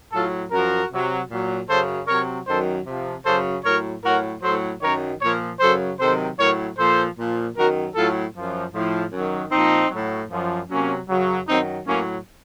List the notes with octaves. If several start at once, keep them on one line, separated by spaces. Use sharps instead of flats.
A2 F#3 F4 A4
F#2 F3 F#4 A#4
C3 F#3
A#2 F#3
F#2 C#3 F#3 A4 C5
C3 F#3 A#4 C#5
F#2 D#3 F#3 A4 C5
C3 F3
F#2 C#3 F#3 A4 C5
A2 F#3 A#4 C#5
A2 F#3 F#4 A#4
A2 F#3 A4 C5
F#2 D#3 F#3 A#4 C#5
A#2 F3 A#4 C#5
F#2 C#3 F#3 A4 C5
C3 D#3 F#3 A4 C5
A2 F#3 A#4 C#5
A#2 F3 A4 C5
A#2 F3
F#2 D#3 F#3 F#4 A#4
A2 F#3 F4 A4
F#2 F3
A2 F3
F#2 D#3 F#3
A#2 F3 C4 D#4
A2 F#3
F#2 F3
C3 F#3 A#3 C#4
F#2 C#3 F#3
F#2 D#3 F#3 C4 D#4
A2 F#3 A#3 C#4